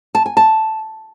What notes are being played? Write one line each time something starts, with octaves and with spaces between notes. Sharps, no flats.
A5
G#5
A5